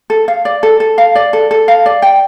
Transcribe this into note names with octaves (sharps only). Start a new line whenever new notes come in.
A4
F5
D5
A4
A4
F5
D5
A4
A4
F5
D5
G5